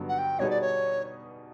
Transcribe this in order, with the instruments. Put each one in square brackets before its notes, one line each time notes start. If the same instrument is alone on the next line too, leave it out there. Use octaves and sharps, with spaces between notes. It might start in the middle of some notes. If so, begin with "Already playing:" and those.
Already playing: [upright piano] G2 D3 F#3 B3 D#4
[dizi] F#5
G5
[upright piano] B2 G3 B3 D#4 G#4 [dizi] C#5
[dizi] D5
C#5